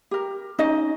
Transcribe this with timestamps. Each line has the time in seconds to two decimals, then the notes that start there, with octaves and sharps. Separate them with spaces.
0.11 G4 A#4
0.59 C#4 D#4 D#5